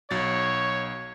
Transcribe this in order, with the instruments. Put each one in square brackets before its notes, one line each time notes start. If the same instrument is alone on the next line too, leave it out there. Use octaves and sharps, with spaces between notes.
[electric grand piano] B1 F#3 A6 [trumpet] C#5